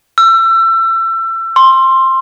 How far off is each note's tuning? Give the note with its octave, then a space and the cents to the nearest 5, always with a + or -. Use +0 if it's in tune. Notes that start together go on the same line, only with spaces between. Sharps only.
E6 +30
C6 +10